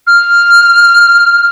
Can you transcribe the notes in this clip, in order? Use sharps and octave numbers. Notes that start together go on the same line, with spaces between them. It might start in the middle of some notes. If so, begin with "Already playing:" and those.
F6